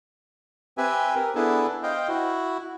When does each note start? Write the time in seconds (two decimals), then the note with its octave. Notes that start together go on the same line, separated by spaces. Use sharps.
0.78 C4 G4 B4 E5 G#5
1.15 A#4
1.35 B3 D4 E4 G#4 A4 B4
1.83 C5 D#5 F5 G5
2.08 E4 F#4